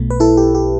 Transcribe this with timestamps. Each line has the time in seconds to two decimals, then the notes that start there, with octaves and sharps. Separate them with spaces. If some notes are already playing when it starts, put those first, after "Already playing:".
Already playing: B1 B2 A3
0.10 B4
0.20 E4 A4
0.37 G4
0.55 G4